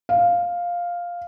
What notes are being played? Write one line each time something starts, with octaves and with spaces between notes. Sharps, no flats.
F5